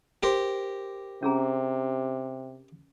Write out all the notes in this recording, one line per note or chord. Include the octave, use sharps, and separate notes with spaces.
G4 A#4 C5
C3 C#4 G#4 A#5